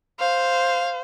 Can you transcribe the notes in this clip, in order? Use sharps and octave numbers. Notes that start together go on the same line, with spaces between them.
C5 F5